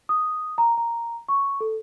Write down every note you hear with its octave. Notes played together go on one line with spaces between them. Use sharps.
D#6
A#5
A#5
C#6
A4